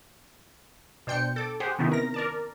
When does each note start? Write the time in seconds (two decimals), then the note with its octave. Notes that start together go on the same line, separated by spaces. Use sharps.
1.07 B2 D4 C5 G5 G6 C#7
1.36 A4 D6
1.60 G4 G#4 C5 F#5
1.79 C3 D#3 B3 C#4 D#4 E4
1.92 A#4 A#6
2.14 A#4 D5 A5